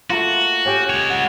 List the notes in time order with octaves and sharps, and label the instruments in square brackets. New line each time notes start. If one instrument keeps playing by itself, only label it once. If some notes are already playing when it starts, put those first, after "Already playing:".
[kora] A3 A#3 F4 [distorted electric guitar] F#4
[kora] C#4 G4 G5
[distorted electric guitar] G#3 C#5
[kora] F#5